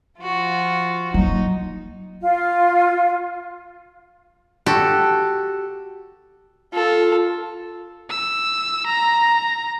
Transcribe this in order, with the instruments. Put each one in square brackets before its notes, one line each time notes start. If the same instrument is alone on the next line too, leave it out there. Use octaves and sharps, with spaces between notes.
[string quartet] F3 F4 F#4
[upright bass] F#3 A#3 [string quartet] D#4
[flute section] F4
[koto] F#4 G4 A4
[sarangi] F4 [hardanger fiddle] A4
[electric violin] E6
A#5